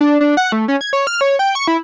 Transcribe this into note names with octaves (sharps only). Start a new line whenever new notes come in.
D4
D4
F#5
A3
C#4
G#6
C#5
F6
C#5
G5
C#6
E4